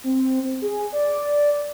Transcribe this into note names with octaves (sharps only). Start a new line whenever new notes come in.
C4
G#4
D5